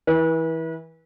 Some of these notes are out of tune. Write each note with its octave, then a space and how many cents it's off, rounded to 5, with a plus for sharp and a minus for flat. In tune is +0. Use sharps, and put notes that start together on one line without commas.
E3 -15 B4 -35